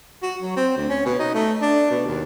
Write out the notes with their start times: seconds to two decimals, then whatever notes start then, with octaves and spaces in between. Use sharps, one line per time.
0.23 F#4
0.42 F#3
0.57 C4
0.77 D2
0.89 C#4
1.06 B2
1.19 D#4
1.35 A3
1.62 D4
1.91 B2
2.06 D#2